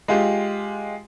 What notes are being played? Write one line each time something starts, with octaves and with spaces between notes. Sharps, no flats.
G#3 F4 G4